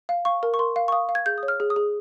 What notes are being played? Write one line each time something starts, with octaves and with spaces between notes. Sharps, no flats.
F5
F5 C#6
A#4
C#6
A#4 C6
F5
C#6
F5 D#6
F5
G#6
G#4 G6
D#6
C#5
F6
G#4
D#6
G#4